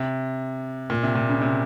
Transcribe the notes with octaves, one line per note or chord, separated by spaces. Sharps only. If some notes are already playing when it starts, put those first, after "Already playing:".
Already playing: C3
A#2
C3
A#2
C#3
C3